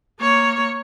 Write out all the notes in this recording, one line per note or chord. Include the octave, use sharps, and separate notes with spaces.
A#3 C#5